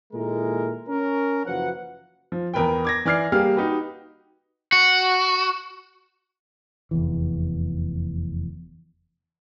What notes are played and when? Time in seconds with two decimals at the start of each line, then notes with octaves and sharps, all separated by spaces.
0.13 A#2 D#3 G#3 E4 A4 A#4
0.88 C#4 A#4
1.46 F#1 E3 F3 F#4 B4 F#5
2.32 F3
2.54 E2 A#4 B4 G5
2.85 D6 G#6 A#6
3.05 E3 D5 D6 F6 G#6 C7
3.32 G3 A#3 G4 G#4 F5 F6
3.56 D#4 F#4 G4 B4
4.72 F#4
6.91 F1 E2 E3